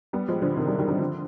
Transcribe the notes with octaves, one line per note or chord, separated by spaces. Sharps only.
G3 B3
F3 G#3
D3 F3
C3 D#3
D#3 G3
D#3 G3
D#3 G3
D3 F3